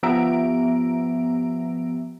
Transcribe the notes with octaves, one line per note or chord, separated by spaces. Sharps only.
F3 B3 G4 E5 A#5 D7